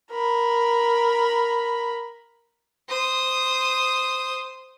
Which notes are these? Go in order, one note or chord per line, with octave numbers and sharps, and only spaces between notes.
A#4 B5
C5 D#6